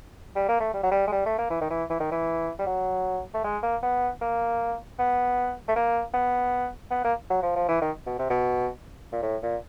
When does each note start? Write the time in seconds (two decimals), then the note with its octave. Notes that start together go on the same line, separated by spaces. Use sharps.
0.36 G3
0.48 A#3
0.60 A3
0.74 G3
0.83 F#3
0.92 G3
1.08 G#3
1.12 G3
1.26 A3
1.39 A#3
1.50 E3
1.61 D#3
1.71 E3
1.90 E3
2.00 D#3
2.12 E3
2.59 G3
2.66 F#3
3.34 A3
3.44 G#3
3.63 A#3
3.83 B3
4.21 A#3
4.99 B3
5.68 A3
5.76 A#3
6.14 B3
6.91 B3
7.05 A#3
7.30 F#3
7.43 F3
7.56 F3
7.69 E3
7.82 D#3
8.07 B2
8.19 C3
8.30 B2
9.13 A#2
9.23 A2
9.43 A#2